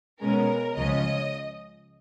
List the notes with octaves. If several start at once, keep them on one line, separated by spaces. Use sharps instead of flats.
B2 G#3 C#4 A#4
C#2 C#3 F3 G#3 C#4 D#5